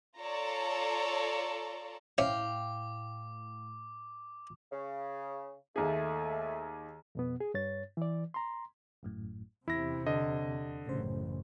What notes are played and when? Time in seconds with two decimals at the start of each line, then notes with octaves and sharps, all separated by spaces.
0.19 F4 A4 C#5 D5 A5 A#5
2.18 A2 C4 C#4 E5 F5 G5 D6
4.72 C#3
5.76 D#2 A3 G#4
7.15 F2 B2 B3
7.40 G#4
7.54 G2 C#5 A6
7.97 E3 D5
8.34 A#5 C6
9.03 G#1 F#2 A2
9.68 E2 C3 E4 A#6
10.06 D3 D#5
10.87 A1 F#2 C#3 C5